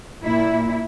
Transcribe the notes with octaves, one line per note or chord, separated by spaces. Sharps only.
A#2 E4